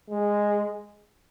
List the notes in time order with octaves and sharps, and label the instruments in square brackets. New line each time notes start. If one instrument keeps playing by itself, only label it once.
[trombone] G#3